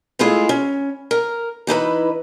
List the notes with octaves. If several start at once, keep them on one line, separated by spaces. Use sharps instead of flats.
G#3 A3 E4 F4 G#4 A4
C#4
A#4
E3 D#4 E4 B4